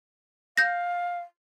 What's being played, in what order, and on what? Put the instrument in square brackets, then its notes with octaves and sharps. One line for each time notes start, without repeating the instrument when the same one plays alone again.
[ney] F5 [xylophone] G6 A#6